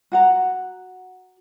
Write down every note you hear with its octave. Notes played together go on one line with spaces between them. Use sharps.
F#4 F#5 A#5